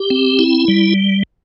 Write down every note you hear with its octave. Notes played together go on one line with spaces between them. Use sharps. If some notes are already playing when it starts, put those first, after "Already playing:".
Already playing: G4
C4
E4
G3